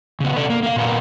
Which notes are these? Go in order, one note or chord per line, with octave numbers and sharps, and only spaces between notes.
C#3 B3
B2 A4 D5
A#3
A#3 F5
A#2 B3 A#4